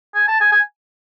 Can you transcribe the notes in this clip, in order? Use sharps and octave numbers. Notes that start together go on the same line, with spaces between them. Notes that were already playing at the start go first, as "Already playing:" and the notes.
G#5
A5
G#5
G#5